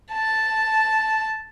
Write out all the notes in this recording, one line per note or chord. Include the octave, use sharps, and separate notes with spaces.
A5